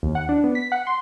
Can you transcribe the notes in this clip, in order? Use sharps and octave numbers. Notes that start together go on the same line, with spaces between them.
D#2
F#5
D4
B3
B6
F#5
C6